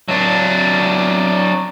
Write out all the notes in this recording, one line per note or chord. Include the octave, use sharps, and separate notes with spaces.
F#3 D4